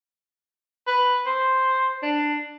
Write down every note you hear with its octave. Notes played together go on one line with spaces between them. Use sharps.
B4
C5
D4